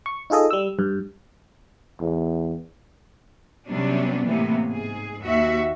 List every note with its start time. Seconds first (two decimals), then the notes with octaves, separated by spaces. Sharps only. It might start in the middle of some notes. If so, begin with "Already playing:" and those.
0.06 C#6
0.30 D#4 F4 G#4 A4 D#5
0.51 G3 E6
0.79 G2
2.00 E2
3.68 C3 F#3 G3 B3 C#4 D4
4.24 A2 C3 E3 A#3 B3
4.68 G#2 G#4
5.23 D#2 F#4 E5